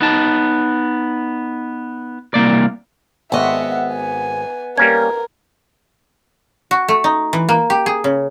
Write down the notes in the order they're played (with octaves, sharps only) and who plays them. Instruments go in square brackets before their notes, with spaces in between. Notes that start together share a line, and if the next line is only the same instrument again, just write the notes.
[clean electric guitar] B3 D#4 A5
C2 C#3 A#3 D5
[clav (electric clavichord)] G#1 [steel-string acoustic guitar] B3 D#5 [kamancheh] E5 F#5
[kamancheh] G#5
[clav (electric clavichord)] G3 A#3 C#4 [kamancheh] A#4 [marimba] G#6
[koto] F#4
A3
D#4
E3
A#3
G4
G#4
C#3